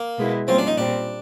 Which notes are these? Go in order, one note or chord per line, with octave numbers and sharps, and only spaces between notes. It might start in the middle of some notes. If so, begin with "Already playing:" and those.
Already playing: A#3
B2 G#3 B3 E4
G3 A#3 C4 C#4 F4
D4
D#4
A#2 G3 C4 D4